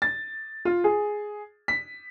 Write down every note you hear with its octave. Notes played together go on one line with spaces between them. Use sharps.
A6
F4
G#4
B6